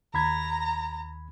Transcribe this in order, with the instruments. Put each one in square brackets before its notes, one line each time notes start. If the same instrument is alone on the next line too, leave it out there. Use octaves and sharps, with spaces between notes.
[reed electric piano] D#2 B5 G#6 [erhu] A#5